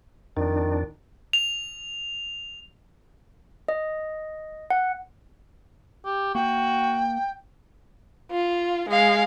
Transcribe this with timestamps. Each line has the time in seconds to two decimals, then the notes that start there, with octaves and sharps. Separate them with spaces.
0.37 F2 D#3 D4
1.33 F7
3.68 D#5
4.70 F#5
6.05 G4
6.35 A#3 F#4 G5
8.32 F4
8.89 G#3 F5